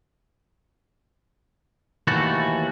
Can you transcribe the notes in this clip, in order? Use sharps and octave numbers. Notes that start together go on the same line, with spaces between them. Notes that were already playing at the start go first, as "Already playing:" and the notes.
D#2 E3 A3 F#4 A5